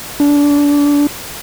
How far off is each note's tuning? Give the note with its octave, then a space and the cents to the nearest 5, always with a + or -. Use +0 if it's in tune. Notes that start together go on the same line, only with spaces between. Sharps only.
D4 -25